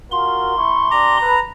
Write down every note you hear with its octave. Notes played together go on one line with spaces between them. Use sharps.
F4 F#4 A#4 C6
A3 E4 C#6
D4 G4 A#5 D6
A4 B4